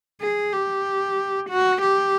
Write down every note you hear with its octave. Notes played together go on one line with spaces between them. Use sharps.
G#4
G4
F#4
G4